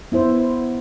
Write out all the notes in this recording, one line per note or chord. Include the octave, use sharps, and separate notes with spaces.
B3 E4 C5